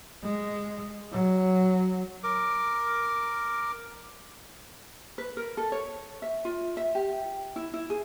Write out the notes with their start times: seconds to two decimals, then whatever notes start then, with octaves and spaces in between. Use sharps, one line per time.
0.24 G#3
1.12 F#3
2.24 A#4 D6
5.18 B4
5.37 A#4
5.57 A4
5.72 C#5
6.22 E5
6.45 F4
6.77 E5
6.95 G4
7.56 E4
7.74 E4
7.90 G#4